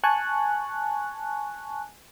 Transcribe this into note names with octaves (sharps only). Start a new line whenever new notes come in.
G#5 A5 C#6 F#6